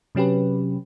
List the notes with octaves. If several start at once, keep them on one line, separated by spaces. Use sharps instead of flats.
C3 F#3 C#4 G4 B4